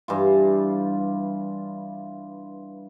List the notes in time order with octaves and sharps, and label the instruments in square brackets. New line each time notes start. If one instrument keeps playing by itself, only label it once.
[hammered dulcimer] G2 E3 F4